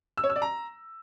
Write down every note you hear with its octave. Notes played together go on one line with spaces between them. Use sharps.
E6
C#5
E6
D5
A#5